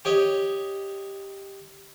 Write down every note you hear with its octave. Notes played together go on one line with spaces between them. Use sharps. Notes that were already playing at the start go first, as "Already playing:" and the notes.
G4 C#5 D#5